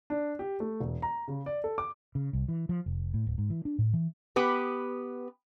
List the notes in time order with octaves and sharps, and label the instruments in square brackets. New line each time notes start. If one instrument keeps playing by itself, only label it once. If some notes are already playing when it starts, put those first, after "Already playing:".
[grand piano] D4
G4
A3
E1
A#5
C#3
D5
A4
D6
[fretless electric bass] C#3
C2
E3
F3
F1
A2
D1
G#2
E3
D4
A2
E3
[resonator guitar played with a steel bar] B3 G4 B4